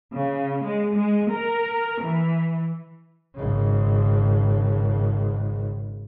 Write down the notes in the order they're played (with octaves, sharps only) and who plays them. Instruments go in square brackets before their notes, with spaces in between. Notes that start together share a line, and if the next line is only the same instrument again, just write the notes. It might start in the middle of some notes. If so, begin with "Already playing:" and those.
[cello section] C#3
G#3
G#3
A#4
E3
[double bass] G#1 C#3